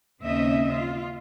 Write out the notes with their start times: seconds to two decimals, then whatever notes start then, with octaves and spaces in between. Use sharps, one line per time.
0.22 D#2 C#3 C4 C#4 D#5 E5
0.72 F4